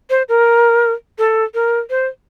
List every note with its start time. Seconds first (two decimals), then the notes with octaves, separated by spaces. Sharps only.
0.10 C5
0.29 A#4
1.19 A4
1.54 A#4
1.90 C5